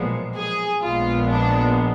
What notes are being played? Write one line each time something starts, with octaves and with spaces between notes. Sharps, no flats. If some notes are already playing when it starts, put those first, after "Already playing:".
Already playing: B1 A#2 F3 G#3 B3
G#4
A#1 A#2 G#3 B3 F4
D4